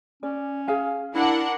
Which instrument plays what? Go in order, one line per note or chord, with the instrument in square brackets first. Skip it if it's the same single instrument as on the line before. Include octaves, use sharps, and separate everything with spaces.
[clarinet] C#4 [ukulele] D5
[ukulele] G#4 F5 G#5
[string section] D4 A#4 F#5 [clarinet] E4